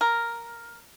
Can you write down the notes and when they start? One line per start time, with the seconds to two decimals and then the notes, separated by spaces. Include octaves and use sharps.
0.01 A#4